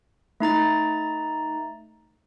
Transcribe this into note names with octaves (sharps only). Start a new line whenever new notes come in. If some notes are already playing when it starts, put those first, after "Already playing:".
A3 D#4 A#5 A6